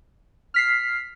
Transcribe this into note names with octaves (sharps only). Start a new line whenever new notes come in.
F6 B6 C7